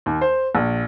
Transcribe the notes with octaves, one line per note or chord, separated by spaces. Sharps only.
D#2
C5
A#1